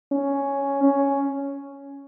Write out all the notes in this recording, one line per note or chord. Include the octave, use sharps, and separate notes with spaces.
C#4
C#4